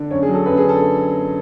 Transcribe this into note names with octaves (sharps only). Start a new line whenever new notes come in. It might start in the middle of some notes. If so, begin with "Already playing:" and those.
Already playing: D3
F#2 C#5
G#4
F#3
A4
F#2 B4
G#4
D3
A4